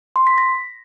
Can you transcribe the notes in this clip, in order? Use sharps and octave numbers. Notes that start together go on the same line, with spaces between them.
C6
B6
A#6